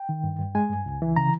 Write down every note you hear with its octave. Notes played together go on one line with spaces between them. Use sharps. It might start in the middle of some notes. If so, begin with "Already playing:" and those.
Already playing: G5
D#3
G2
G2
G#3 G#5
G2
C#2
E3
C#3 A#5